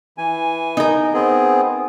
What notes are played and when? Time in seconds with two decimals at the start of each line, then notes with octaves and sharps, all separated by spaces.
0.18 E3 G#5
0.77 D#4 A#4
1.14 B3 C4 G#4